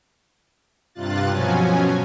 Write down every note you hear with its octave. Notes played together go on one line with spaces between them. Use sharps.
G2 C3 F4 F#6 A6
B2 F3 F#3 C#4 G#5